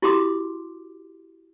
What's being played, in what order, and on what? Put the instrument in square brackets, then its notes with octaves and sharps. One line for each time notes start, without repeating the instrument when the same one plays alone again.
[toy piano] E4 F#4 G4 C6 D6 D#6